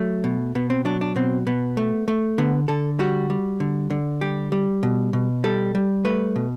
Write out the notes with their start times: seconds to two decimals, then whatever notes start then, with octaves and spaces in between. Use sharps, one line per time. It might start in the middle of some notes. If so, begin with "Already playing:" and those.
Already playing: F#3 A3
0.24 B2
0.55 B2 B3
0.70 C4
0.85 F#3 D4
1.01 D4
1.16 B2 C4
1.47 B2 B3
1.77 A3
2.08 A3
2.38 D3 B3
2.68 D3 A4
2.99 G3 F#4
3.30 G3
3.60 D3
3.90 D3
4.21 G3 G4
4.52 G3
4.83 B2
5.13 B2
5.44 G3 A4
5.75 G3
6.05 A3 B4
6.36 B2